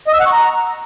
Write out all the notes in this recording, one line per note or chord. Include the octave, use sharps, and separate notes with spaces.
D#5
E6
F#5
C#6
A#5